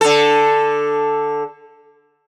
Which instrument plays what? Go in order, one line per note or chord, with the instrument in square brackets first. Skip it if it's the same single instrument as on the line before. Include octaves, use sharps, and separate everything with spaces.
[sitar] D3 A4